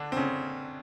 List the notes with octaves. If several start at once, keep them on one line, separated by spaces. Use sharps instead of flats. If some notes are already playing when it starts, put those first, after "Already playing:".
Already playing: D3 D4
C4
C#3 C#4